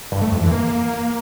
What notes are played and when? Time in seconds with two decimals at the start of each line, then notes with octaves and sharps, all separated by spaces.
0.12 G2
0.22 A3
0.32 F2
0.41 E3
0.51 A#3